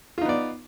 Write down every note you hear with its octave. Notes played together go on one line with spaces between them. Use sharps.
B3 D#4 F4 D5